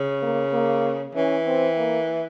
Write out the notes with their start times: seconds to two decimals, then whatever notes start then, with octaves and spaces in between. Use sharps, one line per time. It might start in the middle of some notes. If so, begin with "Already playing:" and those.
Already playing: C#3
0.23 A#3
0.53 A#3
1.15 E3 C#4
1.46 C4
1.78 A#3